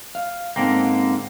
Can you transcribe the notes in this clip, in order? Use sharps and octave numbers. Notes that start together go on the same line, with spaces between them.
F5
G#2 D3 A#3 C4 C#4 G5